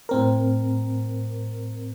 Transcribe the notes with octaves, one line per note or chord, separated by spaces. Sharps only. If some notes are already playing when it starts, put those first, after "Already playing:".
A2 C4 A#4